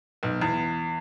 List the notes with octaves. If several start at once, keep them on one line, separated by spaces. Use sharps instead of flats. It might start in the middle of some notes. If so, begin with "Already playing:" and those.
B1
E2